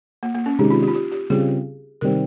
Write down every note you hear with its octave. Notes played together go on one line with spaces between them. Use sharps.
A#3
A#3
C#4
C3 D#3 G#3 C#4 D#4 G#4
F4
G4
F4
G4
G4
C#3 G3 C4 F4 G#4
C3 D#3 G3 C4 A#4